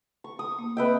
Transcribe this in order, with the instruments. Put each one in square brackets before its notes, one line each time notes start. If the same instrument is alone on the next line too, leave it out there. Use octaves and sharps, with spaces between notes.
[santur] C#6
D#6
[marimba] A#3
[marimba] C4 D#5 [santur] B4 E5 G5